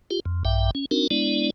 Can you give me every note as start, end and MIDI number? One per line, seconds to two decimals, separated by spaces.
0.11 0.20 65
0.11 0.20 67
0.26 0.43 41
0.45 0.71 34
0.45 0.71 43
0.45 0.71 76
0.45 0.71 79
0.75 0.85 61
0.91 1.07 60
0.91 1.07 62
0.91 1.07 63
0.91 1.07 66
0.91 1.07 70
1.11 1.50 56
1.11 1.50 59
1.11 1.50 62
1.11 1.50 64
1.11 1.50 74